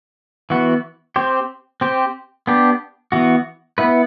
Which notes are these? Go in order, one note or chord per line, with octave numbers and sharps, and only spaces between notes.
E3 B3 F#4
C4 G4 C5
C4 G4 C5
B3 D4 G4
E3 B3 F#4
B3 E4 B4